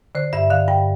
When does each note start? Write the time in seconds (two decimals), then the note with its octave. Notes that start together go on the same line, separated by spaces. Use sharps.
0.15 D3 C5
0.33 G2 E5
0.50 D3 F5
0.68 G2 G5